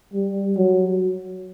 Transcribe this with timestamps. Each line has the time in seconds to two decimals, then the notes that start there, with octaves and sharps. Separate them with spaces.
0.14 G3
0.57 F#3